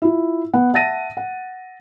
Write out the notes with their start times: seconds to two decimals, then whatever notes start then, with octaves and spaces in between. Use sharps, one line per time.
0.02 E4 F4
0.53 B3 F#5
0.73 E5 F#5 A5 A6 A#6 D#7
1.17 F#5